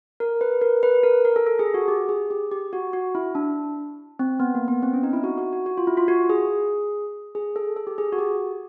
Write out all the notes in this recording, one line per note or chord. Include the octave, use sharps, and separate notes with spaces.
A#4
B4
A#4
B4
A#4
A#4
A4
A4
G#4
F#4
G4
G#4
G4
G4
F#4
F#4
E4
D4
C4
B3
A#3
B3
C4
C#4
D#4
E4
F#4
F#4
F#4
F#4
F4
E4
F4
F#4
G#4
G#4
A4
A4
G4
G#4
F#4
G4